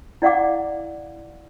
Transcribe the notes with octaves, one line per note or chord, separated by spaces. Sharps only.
E4 D5 F5 F#5 D6